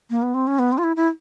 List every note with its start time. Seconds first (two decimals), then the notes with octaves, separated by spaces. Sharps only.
0.10 A#3
0.22 B3
0.34 C4
0.47 C#4
0.59 B3
0.72 C4
0.78 F4
0.84 E4
0.96 E4